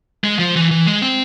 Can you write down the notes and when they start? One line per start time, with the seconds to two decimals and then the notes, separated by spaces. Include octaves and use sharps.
0.24 G#3
0.39 F3
0.56 E3
0.71 E3
0.86 G#3
1.02 C4